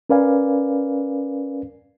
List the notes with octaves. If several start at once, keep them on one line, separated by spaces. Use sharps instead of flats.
C#4 A#4 B4 D5 F5 G#5